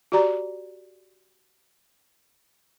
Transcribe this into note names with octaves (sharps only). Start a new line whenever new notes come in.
F#4 G4 D5 A#5